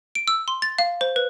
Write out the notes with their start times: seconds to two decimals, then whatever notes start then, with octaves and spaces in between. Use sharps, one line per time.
0.15 D7
0.28 E6
0.48 C6
0.62 A6
0.79 F5
1.01 C5
1.16 B4